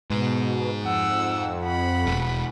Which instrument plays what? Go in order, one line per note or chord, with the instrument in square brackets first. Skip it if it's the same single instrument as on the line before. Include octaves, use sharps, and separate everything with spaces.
[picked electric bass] G#2 [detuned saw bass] B2
[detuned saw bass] F2 [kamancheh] F#5 E6
[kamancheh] F#5 B5
[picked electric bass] E1